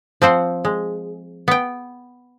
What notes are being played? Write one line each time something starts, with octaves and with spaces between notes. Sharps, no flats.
F3 C4 C5 F#5
G#3
B3 G5